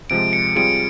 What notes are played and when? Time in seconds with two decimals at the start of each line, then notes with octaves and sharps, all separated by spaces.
0.10 C3 F3 G#3 D7
0.33 C#7
0.56 G3 C4 F4 G#4 D7